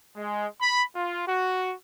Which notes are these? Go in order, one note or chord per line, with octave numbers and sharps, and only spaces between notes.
G#3
B5
F4
F#4